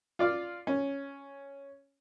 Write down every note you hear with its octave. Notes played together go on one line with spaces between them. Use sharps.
F4 D5 F5
C#4